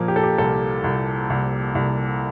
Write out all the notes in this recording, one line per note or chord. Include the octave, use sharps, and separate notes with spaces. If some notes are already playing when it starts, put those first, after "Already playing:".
Already playing: A#2 F3 A#3
G4
A4
G4
C2 A4
C2
C2
C2